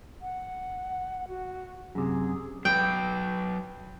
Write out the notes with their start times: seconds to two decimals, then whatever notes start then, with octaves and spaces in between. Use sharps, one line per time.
0.22 F#5
1.28 F#4
1.95 F#2 C3 G#4
2.65 F#3 B4 G5